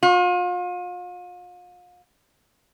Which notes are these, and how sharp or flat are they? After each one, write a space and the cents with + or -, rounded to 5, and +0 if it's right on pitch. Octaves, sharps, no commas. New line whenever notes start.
F4 +40